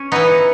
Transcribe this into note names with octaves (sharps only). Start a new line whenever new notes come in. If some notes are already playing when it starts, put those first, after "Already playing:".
Already playing: C#4
E3 B3 D#4